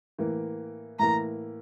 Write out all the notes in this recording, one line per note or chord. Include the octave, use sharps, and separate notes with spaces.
A2 E3 A#3
A2 E3 A#3 A#5